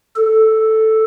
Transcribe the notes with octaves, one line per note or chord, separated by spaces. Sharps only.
A4